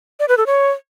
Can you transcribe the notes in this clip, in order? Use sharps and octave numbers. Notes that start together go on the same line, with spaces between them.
D5
B4
A4
C#5